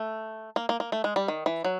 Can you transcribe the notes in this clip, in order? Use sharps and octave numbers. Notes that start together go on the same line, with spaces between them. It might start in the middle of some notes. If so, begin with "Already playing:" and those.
Already playing: A3
A#3
A#3
A#3
A3
G#3
G3
D#3
E3
F#3